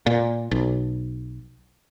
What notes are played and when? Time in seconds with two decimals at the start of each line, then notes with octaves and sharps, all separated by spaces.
0.06 A#2
0.51 B1